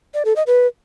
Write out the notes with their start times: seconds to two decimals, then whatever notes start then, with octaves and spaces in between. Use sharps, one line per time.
0.14 D5
0.25 A4
0.36 D#5
0.47 B4